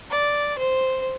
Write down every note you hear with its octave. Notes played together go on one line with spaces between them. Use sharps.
D5
C5